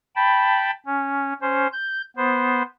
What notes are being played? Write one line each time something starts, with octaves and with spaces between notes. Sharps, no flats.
G5 A5 B5
C#4
C#4 C5
G6
B3 C5